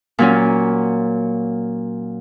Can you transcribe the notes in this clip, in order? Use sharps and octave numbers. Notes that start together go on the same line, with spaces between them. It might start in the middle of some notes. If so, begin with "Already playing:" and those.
A#2 F#3 C#4